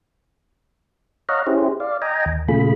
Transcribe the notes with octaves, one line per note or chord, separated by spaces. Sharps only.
C#5 D#5 F5 F#5 A#5
C#4 E4 G4 G#4 C5
D5 F5
D#5 G5 G#5 A#5
D#2
A#2 C#3 A3 F4 G#4 B5